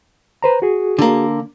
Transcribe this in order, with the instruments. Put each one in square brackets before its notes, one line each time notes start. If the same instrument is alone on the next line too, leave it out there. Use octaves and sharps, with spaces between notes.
[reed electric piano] B4 C5 A#5
F#4 G#4
[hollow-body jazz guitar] D3 A#3